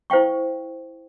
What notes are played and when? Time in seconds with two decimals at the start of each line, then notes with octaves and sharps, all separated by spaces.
0.10 E4 C5 F5 G5 C#6